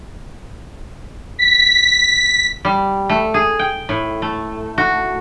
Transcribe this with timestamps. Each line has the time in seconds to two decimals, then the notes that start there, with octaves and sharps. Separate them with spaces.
1.39 B6
2.65 G3
3.09 A3
3.34 G#4
3.59 G5
3.89 A2
4.22 A3
4.78 F#4